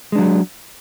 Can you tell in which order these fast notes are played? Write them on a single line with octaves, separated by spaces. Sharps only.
G#3 D4 F#3